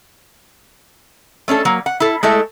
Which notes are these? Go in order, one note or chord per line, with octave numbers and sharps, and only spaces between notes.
A3 C#4 D4 A4
F#3 A#3
F#5
E4 A4
G#3 A3 E4 A4 E5